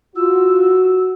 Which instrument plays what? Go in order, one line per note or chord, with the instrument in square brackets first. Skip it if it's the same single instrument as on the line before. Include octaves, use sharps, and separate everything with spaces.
[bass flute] F4 [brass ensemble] F#4 [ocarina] E6